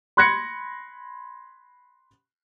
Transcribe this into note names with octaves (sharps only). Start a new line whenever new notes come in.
B5 C6 F#6 G#6 A#6 C#7